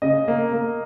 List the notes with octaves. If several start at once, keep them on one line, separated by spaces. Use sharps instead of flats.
C#3 D#5
A#3
A#3